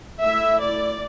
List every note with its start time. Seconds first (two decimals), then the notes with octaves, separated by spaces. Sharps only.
0.21 A3 E4 E5
0.61 D5